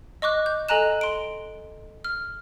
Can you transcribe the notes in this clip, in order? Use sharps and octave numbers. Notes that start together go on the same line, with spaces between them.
D#5 C#6 D6 F#6
G6
A4 D#5 G#5 A#5 F#6 E7
C6 D7
F6